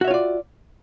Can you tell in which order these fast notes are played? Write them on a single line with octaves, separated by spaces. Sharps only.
F#4 E5 C#5 F4 D5